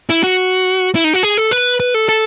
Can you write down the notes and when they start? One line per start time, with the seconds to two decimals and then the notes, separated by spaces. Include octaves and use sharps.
0.10 E4
0.23 F#4
0.95 E4
1.04 D#4
1.14 F#4
1.23 G#4
1.38 A4
1.51 B4
1.80 B4
1.94 A4
2.09 A4